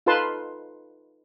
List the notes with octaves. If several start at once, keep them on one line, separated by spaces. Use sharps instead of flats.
D#4 F4 A4 B4 A5 C6